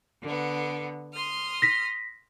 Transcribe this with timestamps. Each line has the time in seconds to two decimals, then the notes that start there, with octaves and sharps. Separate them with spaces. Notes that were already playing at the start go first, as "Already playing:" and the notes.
0.22 D3 B3
1.12 C6 D#6 F6
1.62 A#6 B6